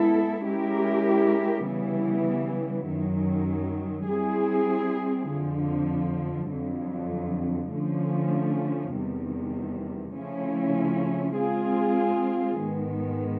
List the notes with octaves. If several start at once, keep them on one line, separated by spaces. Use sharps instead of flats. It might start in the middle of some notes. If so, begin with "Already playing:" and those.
Already playing: G#3 B3 E4 A4
G#3 C#4 E4 G4 A#4
C#3 E3 G3 B3 E4
F#2 D#3 F#3
G3 C4 E4 G#4
F2 D3 F3
F2 D3 F#3
D3 F3 A3 C#4
E2 C3 D#3 G3
C#3 F3 A3 C#4 E4
G#3 C4 F4 G#4
G#2 D#3 G#3 B3